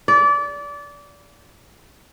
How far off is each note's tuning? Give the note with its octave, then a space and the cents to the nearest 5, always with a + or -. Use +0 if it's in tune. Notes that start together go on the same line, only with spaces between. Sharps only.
D5 -25